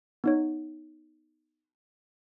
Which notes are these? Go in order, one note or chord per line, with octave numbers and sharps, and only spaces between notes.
B3 D#4 C#5